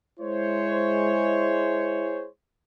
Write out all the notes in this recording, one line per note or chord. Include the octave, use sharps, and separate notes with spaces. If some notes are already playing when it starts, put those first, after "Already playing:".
G#3 E4 C5 C#5